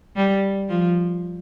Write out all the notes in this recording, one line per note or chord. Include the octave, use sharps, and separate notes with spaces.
G3
F3